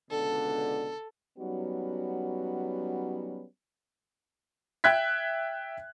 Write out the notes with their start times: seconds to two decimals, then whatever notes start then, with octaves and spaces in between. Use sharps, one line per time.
0.11 C#2 B2 D3 A4
1.38 F#3 G3 B3 C#4 D#4 F#4
4.84 E5 G5 F#6 G#6 B6